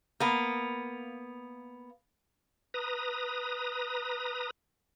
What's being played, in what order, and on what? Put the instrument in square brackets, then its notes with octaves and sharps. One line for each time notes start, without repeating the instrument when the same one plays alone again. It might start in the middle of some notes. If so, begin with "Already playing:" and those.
[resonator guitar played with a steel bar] A#3 B3
[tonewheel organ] B4 A#5 D#6